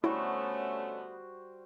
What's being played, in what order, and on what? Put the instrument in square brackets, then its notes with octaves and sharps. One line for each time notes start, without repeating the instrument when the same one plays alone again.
[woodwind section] D3 A3 B3 [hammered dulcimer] G3 F#4 C5 [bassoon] C#4 [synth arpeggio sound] E4